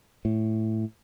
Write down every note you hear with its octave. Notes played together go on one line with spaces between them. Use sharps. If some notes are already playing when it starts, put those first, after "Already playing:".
A2